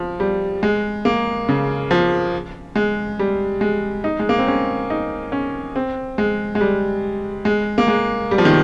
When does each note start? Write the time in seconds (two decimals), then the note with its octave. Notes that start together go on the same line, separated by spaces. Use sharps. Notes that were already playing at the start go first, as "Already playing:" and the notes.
Already playing: F3
0.20 G3
0.63 G#3
1.05 A#3
1.49 C#3
1.91 F3
2.76 G#3
3.19 G3
3.61 G#3
4.04 D#4
4.20 G#3
4.29 A#3
4.39 C4
4.47 C#4
4.90 D#4
5.32 C#4
5.76 C4
6.18 G#3
6.55 G#3
6.61 G3
7.45 G#3
7.78 A#3
7.88 G#3
8.31 G3
8.38 F3
8.45 D#3